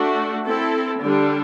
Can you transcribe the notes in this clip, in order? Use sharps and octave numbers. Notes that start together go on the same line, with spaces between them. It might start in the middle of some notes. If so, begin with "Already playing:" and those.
Already playing: A3 D4 F#4
C4 E4 A4
D3 G3 D4